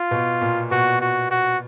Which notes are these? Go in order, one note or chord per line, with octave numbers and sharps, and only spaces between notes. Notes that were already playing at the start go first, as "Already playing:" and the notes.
Already playing: F4
B2
A#2
B2 F#4
F#4
F#4